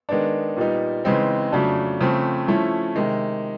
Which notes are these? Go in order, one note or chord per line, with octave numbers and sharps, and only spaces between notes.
D#3 G#3 B3 D4
A#2 G3 B3 D#4
C#3 E3 G#3 C4 D#4
F2 C#3 F#3 A3 D4
C#3 F3 A3 C4
F3 A3 C#4 E4
C3 D#3 G#3